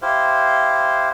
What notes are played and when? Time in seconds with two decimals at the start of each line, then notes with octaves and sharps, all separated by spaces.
0.02 E4 G4 C5 F5